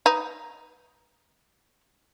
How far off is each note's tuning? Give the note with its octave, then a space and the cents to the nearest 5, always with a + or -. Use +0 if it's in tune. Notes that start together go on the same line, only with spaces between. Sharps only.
D#4 +0 B4 +0